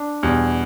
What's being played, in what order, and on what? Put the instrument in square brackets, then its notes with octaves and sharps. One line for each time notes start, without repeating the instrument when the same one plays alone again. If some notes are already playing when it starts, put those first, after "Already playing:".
Already playing: [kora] D4
[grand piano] E2 B2 G3